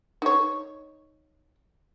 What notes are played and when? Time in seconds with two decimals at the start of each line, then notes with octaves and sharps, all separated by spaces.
0.22 D#4 C#5